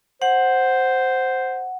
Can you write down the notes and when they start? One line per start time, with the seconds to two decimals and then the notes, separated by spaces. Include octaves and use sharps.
0.22 C5 F#5